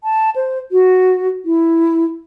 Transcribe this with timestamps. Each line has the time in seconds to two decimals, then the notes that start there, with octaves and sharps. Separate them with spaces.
0.04 A5
0.36 C5
0.72 F#4
1.45 E4